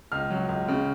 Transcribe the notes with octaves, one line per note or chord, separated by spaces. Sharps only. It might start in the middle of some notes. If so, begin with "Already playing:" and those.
C#2 F6
F#3
C#2
C#3